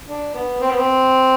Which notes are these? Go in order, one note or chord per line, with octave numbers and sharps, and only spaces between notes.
D4
B3
C4
B3
C4